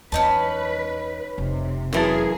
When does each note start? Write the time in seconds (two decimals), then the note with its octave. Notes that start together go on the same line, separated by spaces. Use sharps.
0.12 E2 C#4 D#4 B4 A5
1.38 F1 C3
1.93 F#2 E3 A#3 G#4 A#4 A5